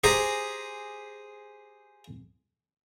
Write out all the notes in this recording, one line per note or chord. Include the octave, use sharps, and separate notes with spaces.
G4 G#4 C5 G#5 A#5